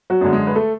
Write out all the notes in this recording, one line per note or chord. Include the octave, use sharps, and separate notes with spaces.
F#3 F#4
F#2 D3 G#3
G#3 G#4
B4
A3 A4